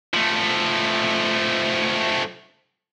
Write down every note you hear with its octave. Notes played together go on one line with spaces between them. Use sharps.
F3 A3